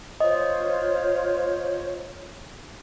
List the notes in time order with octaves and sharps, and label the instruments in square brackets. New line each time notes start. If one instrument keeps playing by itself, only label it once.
[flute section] F4 C5 C#5 [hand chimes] D#5